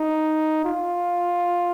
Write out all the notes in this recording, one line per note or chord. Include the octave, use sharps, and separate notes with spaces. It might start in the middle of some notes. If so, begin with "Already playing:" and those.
Already playing: D#4
F4